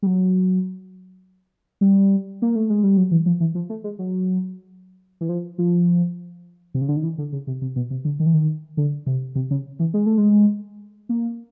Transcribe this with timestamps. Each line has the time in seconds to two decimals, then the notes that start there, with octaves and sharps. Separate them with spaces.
0.02 G3
0.07 F#3
1.81 G3
2.42 A#3
2.56 A3
2.70 G#3
2.83 G3
2.97 F#3
3.11 E3
3.26 F3
3.40 E3
3.55 F3
3.70 A3
3.84 G#3
3.99 F#3
5.21 E3
5.29 F3
5.58 F3
6.74 C3
6.81 C#3
6.89 D3
6.96 D#3
7.03 E3
7.18 D3
7.32 C#3
7.47 C3
7.62 C3
7.76 B2
7.91 C3
8.05 D3
8.20 D#3
8.26 E3
8.34 D#3
8.77 D3
9.07 C3
9.35 C3
9.51 C#3
9.79 E3
9.94 G#3
10.06 A3
10.18 G#3
11.09 A#3